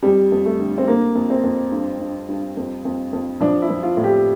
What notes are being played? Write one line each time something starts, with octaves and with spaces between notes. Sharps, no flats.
F2 G3
F2
A3
D3
C4
D3 A#3
F2
C4
F2
G2
G2
G2
F2
F2
F2
F3 D4
E4
F3
F4
A2
G4